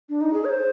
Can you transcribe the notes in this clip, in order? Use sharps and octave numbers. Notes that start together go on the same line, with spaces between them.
D4
D#4
G#4
C#5
C5